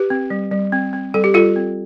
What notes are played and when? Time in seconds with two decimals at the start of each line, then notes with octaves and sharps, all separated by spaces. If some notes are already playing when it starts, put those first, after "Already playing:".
Already playing: G4 B4
0.10 C4
0.30 G3
0.51 G3
0.72 C4
0.93 C4
1.14 G3 A4
1.24 G4
1.34 G3 F4 A4
1.56 C4